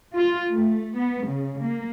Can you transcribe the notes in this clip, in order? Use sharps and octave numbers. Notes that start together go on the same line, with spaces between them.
F4
A3
B3
C#3
A#3